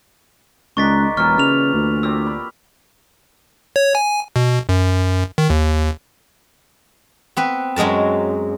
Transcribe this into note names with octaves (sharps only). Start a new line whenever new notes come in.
C#2 D#3 G#3 D4 C#6 A6 B6
E1 A#2 E3 F#3 C#6 F6
C#3 F6 F7
D2
A#2 C4 G4 E6
B5
C#5
G#5
B2
F#2
D#3
D#2
B3 C4 B4
F#2 F#3 G#3 A#4 A5